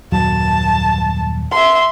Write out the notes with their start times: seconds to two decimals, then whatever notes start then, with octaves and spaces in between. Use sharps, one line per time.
0.12 D#1 F#2 F#3 A5
1.51 E5 C6